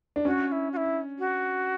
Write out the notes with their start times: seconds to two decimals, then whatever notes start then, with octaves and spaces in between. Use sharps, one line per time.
0.16 D4
0.25 C#4 F#4
0.48 F#4
0.52 E4
0.72 F#4
0.77 E4
1.19 F#4